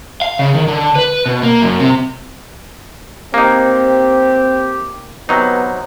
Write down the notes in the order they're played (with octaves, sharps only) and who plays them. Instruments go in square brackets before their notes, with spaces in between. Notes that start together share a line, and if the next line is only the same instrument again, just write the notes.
[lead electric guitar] F5
C#3
D#3
D3
B4
B2
A#3
F#2
C3
[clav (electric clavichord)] A#3 D#4 [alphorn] C4 [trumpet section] G4
[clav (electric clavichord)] C3 F#3 D#4 [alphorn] B3